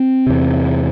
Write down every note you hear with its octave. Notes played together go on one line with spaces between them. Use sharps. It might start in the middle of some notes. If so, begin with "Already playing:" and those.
Already playing: C4
E2 C3